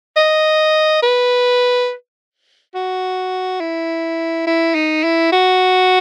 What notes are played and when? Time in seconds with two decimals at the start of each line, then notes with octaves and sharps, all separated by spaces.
0.17 D#5
1.02 B4
2.75 F#4
3.60 E4
4.47 E4
4.75 D#4
5.04 E4
5.32 F#4